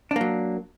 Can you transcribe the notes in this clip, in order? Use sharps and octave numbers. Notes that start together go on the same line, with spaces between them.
F#3 A#3 D4